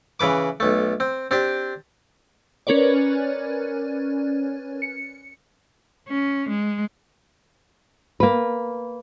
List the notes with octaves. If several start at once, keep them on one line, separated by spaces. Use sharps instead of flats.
C#3 E3 B4 D6
B1 A3
C4
C4 D4 G4
C#4 A#4 B4 C#5 D5
C#7
C#4
G#3
A#3 B4